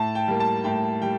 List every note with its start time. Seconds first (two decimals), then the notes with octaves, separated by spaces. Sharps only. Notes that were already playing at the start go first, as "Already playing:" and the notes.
Already playing: A2 A5
0.15 G5
0.28 G3 A#3
0.40 A5
0.64 A2 G5
1.02 G3 G5